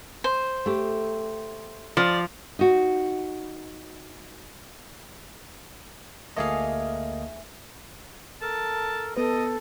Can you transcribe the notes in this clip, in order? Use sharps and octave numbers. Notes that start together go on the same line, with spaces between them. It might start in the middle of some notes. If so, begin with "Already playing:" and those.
C5
A3 G4
F3 D5
D#4 F#4
D2 A3 A#3 G#4 D#5 F5
A4 A#4 A5
B3 A4 B4 D#5